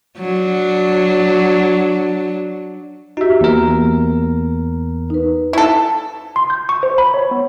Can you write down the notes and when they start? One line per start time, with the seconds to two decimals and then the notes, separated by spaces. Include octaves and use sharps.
0.18 F#3 D4
3.17 D#4 F#4 G4 E5
3.41 E2 A#3 A#4
5.10 D#4 B4
5.53 E4 A4
6.36 C6
6.50 G6
6.69 C#6
6.83 C5
6.98 B5
7.14 C#5
7.31 B3